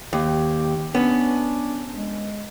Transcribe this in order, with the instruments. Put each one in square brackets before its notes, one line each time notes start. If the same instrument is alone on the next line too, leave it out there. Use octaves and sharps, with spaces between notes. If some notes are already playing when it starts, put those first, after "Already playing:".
[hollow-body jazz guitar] D#2 [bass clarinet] G4
[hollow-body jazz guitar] B3 C#4 [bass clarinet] D4
[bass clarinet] G#3